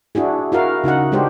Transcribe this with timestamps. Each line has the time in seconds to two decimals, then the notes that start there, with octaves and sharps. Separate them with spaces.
0.15 D4 E4 F#4 G#4
0.52 E4 F#4 A#4 F5
0.84 C#3 D#4 F#4 F#5
1.12 G#3 D4 G4 C5